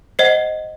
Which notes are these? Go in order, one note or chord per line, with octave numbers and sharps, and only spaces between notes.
C5 D#5 F#5 C7